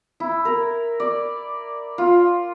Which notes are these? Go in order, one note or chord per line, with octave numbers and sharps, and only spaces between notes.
E4
A#4
D5
F4